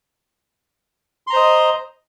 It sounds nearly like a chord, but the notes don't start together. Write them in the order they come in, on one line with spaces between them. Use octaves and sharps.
C6 A#5 C5 D#5